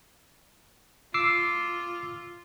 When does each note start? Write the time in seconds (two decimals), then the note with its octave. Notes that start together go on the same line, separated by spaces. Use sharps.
1.14 F4 D6 E6 C7